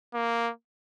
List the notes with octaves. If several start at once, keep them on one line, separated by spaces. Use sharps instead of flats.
A#3